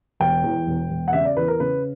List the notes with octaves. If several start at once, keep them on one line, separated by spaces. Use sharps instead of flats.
E1 G5
E2
E1
E1
F#5
C#3 E5
D5
E2 B4
A#4
C#3 B4